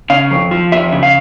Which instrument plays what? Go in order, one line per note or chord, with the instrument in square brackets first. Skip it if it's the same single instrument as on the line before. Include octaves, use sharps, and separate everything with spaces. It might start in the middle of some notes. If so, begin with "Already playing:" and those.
[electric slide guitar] C#3 F5
F2
F3
F2 E5
C#3
F5